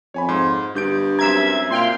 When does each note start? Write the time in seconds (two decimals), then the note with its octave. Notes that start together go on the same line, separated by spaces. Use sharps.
0.14 F2 C#5 G#5 B5
0.29 G#2 C6
0.75 G1 G2 G6 D7
1.19 F#2 C4 E5 A#5 G#6
1.70 A#2 F5 G5 C6